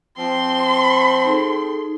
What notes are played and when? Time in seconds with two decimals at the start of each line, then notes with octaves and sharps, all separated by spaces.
0.18 F3 C4 C6
1.24 D#4 G#4 A4